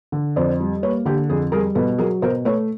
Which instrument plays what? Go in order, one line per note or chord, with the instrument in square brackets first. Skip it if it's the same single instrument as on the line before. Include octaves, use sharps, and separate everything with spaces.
[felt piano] D3
F2 C5 D5
G3
A#3 B4 C#5
D3 G4
F2 G#4
G3 G#4 A#4
B2 A4 B4
F#3 G#4 A#4
B2 A#4 C5
A3 B4 C#5